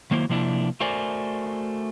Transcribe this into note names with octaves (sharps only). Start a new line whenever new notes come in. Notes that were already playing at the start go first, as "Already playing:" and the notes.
D#3 F#3 A#3 E4 C5
C3 F3 A#3 D4 E4
A3 F#4 A#4 C5 D5 G#5